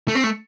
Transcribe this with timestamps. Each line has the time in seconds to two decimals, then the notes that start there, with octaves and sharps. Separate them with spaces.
0.08 A3
0.15 C4
0.24 A3